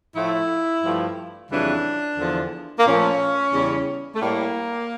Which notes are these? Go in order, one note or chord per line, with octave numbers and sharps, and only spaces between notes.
A2 F3 A3 E4
G2 F3 A3
F2 C#3 E3 G3 D4
E2 D3 F3
A#3
A#2 F3 A3 C#4
E2 C#3 G3
A3
A2 G3 A#3